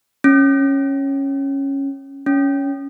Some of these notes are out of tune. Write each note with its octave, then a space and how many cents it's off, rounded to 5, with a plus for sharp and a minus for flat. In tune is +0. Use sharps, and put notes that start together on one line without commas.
C#4 -10
C#4 +10